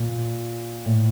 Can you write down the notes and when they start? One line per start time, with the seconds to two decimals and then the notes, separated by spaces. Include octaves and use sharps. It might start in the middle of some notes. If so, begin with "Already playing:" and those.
Already playing: A#2
0.86 A2